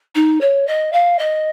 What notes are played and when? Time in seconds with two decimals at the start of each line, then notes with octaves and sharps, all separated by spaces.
0.15 D#4
0.41 C#5
0.67 D#5
0.92 F5
1.19 D#5